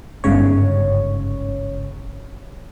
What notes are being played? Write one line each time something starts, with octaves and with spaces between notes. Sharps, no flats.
G1 G#2 C#3 C#5